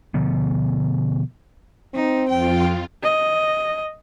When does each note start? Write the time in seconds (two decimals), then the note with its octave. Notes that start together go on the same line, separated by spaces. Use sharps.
0.14 B2 D3 F3 B3
1.94 C4 D#4
2.29 F2 F4 G5
3.03 D#5